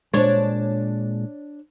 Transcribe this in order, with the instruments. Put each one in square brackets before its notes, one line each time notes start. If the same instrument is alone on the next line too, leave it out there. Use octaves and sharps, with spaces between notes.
[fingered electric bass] A#2 G#3 [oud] D4 C#5